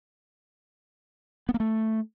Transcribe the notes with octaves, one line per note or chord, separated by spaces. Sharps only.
B3
A#3
A3